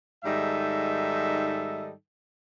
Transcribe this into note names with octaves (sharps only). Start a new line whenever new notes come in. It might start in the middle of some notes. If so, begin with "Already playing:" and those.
G#2 D#3 G3 D#4 A4 E5